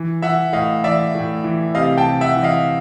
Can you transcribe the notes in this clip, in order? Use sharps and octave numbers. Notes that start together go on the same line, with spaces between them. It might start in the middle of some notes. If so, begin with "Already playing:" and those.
Already playing: E3
E3 E5 F#5
A2 D#5 F5
E3 D5 E5
A2
E3
C3 D#5 F5
G5 A5
C3
E5 F#5
E3
D#5 F5